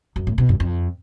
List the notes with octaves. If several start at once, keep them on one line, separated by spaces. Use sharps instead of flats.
F#2
A2
B2
F#2
F2